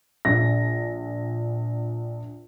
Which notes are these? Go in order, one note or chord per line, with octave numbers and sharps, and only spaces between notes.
A#1 A#6